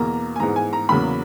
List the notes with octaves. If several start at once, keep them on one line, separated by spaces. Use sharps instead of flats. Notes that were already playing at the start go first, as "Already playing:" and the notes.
Already playing: E2 B2 A#3 A#5
G#5
G#2 E3 G#3 B3 A#5
G#5
A#5
E2 C#3 F#3 A#3 B5